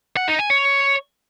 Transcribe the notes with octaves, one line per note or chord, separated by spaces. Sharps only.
F#5
D#4
G#5
C#5